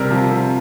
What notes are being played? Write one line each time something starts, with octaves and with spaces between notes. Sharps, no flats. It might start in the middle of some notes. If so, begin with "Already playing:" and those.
Already playing: C3 G3 A#4
F3
C3